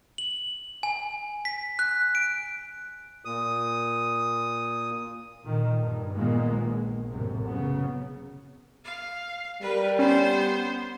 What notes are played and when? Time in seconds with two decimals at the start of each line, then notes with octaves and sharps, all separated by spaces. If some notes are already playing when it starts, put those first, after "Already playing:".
0.18 F#7
0.83 G#5
1.45 B6
1.79 F#6
2.15 D7
3.25 A#2 D#6
5.43 A#2 D#3
5.80 G2
6.14 A#2 D#3 G#3 A#3 B3
6.49 A#1
7.10 A1 F#2 C3
7.45 C#3 F#3 B3
8.84 F5
9.61 G3 A#4 B4
9.99 B3 C#4 C5